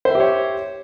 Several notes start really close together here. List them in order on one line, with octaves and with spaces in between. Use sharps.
C5 E5 G4 C#5